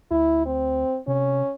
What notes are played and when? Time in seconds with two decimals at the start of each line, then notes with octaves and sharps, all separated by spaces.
0.11 D2 E4
0.46 C4
1.07 C3 C#4